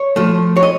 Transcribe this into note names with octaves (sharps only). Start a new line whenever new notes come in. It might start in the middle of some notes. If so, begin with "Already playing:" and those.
Already playing: C#5
F3 A3
C#5
D#5